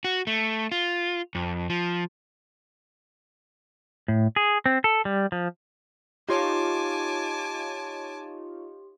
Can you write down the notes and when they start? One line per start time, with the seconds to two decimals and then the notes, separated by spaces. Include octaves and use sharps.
0.04 F#4
0.27 A3
0.72 F4
1.35 F2
1.70 F3
4.08 A2
4.36 G#4
4.66 C4
4.84 A4
5.05 G3
5.32 F3
6.29 D#4 F4 G4 C#5 G#5 A5 C6 D6